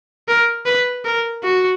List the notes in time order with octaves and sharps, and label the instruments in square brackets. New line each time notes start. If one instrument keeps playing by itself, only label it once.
[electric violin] A#4
B4
A#4
F#4